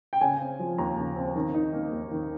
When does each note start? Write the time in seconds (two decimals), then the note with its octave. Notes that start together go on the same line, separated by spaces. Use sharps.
0.13 G5
0.21 C#3 G#5
0.40 C4
0.59 F3
0.78 D#2 A#5
0.97 C#3
1.16 C4
1.36 D#3
1.54 D#4
1.73 A#3
1.92 D#2
2.11 D#3